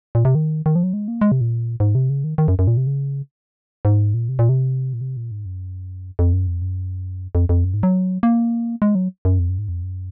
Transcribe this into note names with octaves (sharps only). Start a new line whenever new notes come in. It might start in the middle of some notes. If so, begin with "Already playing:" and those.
A#2
C3
D#3
D#3
F3
F#3
G#3
A#3
G#3
C3
A#2
G#2
C3
C#3
D#3
D#3
F#2
F#2
A#2
C3
C#3
G#2
A#2
C3
A#2
C3
A#2
C3
A#2
G#2
F#2
F2
F#2
F2
F#2
F2
F2
F#2
G#2
F#3
A#3
G#3
F#3
F#2
F2
F#2
G#2
F2
F#2